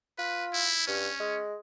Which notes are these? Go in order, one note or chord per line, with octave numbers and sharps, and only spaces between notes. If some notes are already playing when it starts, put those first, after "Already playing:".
F4 B4
E4
G2 C#4
G#3